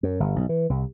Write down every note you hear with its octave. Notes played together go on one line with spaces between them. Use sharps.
F#2
G1
B1
E3
C2